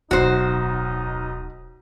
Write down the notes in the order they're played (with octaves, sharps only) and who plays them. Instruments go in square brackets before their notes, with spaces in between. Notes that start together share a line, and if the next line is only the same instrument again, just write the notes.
[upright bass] D1 F4 [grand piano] B1 [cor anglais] D#4 [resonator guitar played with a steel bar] F#4 C5